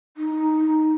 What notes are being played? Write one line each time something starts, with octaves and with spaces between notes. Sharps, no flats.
D#4